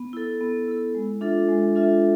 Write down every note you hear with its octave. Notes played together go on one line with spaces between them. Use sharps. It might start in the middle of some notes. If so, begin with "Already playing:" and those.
Already playing: B3
E4 A4
B3
E4 A4
G#3
D4 F4 A4 E5
G#3
D4 F4 A4 E5